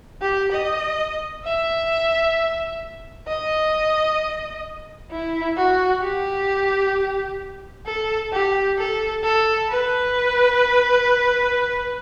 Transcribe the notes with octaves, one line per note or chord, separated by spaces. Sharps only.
G4
D#5
E5
D#5
E4
F#4
G4
A4
G4
A4
A4
B4